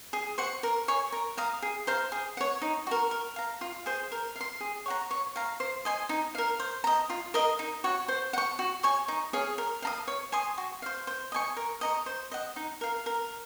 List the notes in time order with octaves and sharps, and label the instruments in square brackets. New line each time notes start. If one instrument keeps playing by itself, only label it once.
[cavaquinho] G#4
C5 F#5 C#6
A#4
C#5 G#5
A#4
F5 A#5 D#6
G#4
C5 F5 A#5
G#4
C#5 F#5
D#4
F#4 A#4
A#4
F5 A#5
F4
G#4 C5
A#4
F5
C6
G#4
C#5 F#5 A#5
C#5
F5 A#5
C5
D#5 G#5 C6
D#4
A#4 F5
C5
D#5 A#5
F4
A#4 D#5 A#5
D#4
F#4 C#5 F#5
C5
F#5
C#6
F#4
C#5 G#5 C#6
D#4
G#4 C#5 F5
A#4
F5 A#5 D#6
C#5
G#5 C6 D#6
F#4
C5 F5
C5
D#5 G#5 C#6
A#4
D#5 A#5 C#6
C5
D#5 F#5
D#4
A#4 F5
A#4